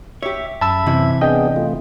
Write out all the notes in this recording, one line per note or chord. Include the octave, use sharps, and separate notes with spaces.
G4 C#5 E5
F#2 E5 A5 B5 E6 G#6
C3 E3 E4
B3 D4 G#4 D#5 G5
A3 F4